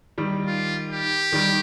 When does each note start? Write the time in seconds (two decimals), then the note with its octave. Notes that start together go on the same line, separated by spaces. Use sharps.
0.18 D#3 G3
0.46 F4
0.90 G4
1.32 D#3 G3